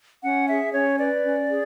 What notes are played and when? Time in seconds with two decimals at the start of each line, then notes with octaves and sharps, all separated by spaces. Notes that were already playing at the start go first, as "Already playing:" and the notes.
0.23 C#4 F#5
0.49 G#4 E5
0.73 C#4 C#5
0.98 B4 D5
1.23 C#4
1.49 G#4